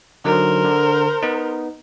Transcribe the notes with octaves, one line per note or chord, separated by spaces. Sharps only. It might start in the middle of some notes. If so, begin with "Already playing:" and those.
D3 F#3 D#4 A#4 C5
D3
B3 D#4